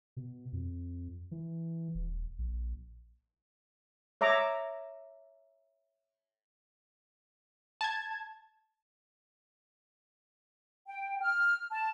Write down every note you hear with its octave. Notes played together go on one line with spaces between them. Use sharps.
B2
F2
E3
D#1
A#1
C#5 E5 A#5 D6
A5 G#6
G5
F6
A5